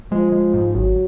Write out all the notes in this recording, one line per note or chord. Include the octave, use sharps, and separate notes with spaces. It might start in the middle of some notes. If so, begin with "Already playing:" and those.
F3 G#3
G#3
G#2
G#1 F#3